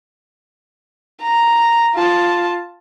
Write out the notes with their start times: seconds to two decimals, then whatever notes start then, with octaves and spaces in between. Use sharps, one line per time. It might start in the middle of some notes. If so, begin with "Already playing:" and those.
1.22 A#5
1.95 F4 A5